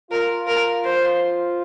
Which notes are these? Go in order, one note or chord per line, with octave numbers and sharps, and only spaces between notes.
F4 A#4
A#4
C5